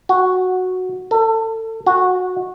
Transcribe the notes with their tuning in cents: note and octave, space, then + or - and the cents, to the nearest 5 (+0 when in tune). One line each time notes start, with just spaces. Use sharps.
F#4 -5
A4 +30
F#4 -15